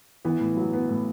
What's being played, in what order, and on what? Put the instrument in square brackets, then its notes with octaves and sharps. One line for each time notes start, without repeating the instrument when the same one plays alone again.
[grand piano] E3 [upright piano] B3
[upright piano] A2
F#3
B3
A2